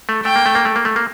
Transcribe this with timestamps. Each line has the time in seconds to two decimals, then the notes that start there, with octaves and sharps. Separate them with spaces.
0.09 A3
0.25 A3 G5
0.36 A#3
0.46 A3
0.55 A#3
0.65 A3
0.76 A#3
0.85 A3
0.96 A#3